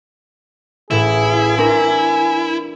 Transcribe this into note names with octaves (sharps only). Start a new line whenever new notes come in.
A1 A2 E4 G#4
C4 D4 A#4 G#5